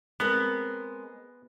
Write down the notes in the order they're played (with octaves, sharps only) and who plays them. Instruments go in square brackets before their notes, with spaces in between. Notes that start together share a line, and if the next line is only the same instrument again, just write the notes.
[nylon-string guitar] G#3 C4 A#4 [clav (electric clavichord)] B3